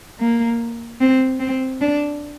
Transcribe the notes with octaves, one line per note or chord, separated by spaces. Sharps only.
A#3
C4
C4
D4